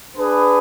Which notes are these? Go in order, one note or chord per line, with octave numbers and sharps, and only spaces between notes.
D4 G#4 B4